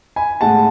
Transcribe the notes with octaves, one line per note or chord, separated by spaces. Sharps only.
G#5 B5
A2 G#3 F#5 A5